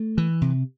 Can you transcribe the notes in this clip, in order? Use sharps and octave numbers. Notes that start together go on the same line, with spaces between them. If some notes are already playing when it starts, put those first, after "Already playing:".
Already playing: A3
E3
C3